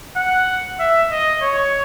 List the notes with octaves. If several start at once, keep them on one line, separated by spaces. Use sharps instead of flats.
F#5
E5
D#5
C#5